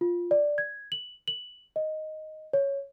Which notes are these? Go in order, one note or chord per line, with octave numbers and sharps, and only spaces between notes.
F4
D5
G#6
F#7
F#7
D#5
C#5